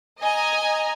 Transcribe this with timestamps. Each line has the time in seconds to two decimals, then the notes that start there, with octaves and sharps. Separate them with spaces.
0.21 D#5 G#5 A#5